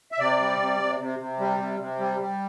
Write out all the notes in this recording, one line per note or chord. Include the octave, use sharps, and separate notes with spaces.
E5
C3 D5
G3
C3
C3
C3
C3
G3
C3
C3
G3
G3